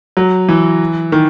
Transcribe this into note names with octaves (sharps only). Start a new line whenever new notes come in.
F#3
E3
D#3